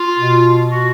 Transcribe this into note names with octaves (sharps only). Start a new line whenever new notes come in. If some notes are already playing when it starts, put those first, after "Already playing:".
Already playing: F4
B2
F#4